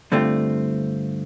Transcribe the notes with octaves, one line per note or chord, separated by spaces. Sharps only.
G2 D3 A3 C4 F4